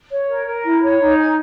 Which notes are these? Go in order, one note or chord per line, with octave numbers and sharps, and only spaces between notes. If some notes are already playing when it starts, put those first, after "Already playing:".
C#5
A#4
A#4
E4
C#5
D#4
G#5